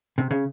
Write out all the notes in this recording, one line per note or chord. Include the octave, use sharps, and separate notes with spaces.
C3
C#3